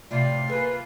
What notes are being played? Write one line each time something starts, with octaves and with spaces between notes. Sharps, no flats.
A2 C3 F4 D5
A#3 G#4 B4